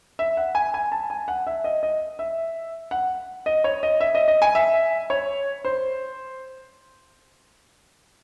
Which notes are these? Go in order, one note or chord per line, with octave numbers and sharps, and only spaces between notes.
E5
F#5
G#5
G#5
A5
G#5
F#5
E5
D#5
D#5
E5
F#5
D#5
C#5
D#5
E5
D#5
D#5
G#5
E5
C#5
C5